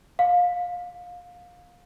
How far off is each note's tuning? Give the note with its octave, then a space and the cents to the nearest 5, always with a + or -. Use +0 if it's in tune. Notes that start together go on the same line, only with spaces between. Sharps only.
F5 +25